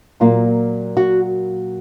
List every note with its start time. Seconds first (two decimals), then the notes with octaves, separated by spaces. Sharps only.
0.20 A#2 F#3 A#3 F4
0.97 F#4